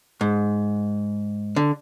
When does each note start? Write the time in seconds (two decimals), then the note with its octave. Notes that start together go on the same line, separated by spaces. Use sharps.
0.21 G#2
1.56 D3